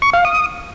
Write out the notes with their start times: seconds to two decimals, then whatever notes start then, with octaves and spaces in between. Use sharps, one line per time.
0.02 C#6
0.13 F5
0.25 D#6